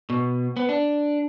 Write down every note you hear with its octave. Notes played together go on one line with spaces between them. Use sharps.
B2
B3
D4